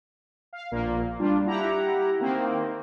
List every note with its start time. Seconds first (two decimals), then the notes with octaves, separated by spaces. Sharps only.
0.53 F5
0.72 A#1 A#2 A#3
1.19 G3 D4 F4
1.47 E4 G4 F#5 A#5
2.19 D#3 A#3 C4